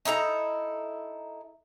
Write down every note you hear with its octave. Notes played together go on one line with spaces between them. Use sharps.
D#4 E4 A4 A#5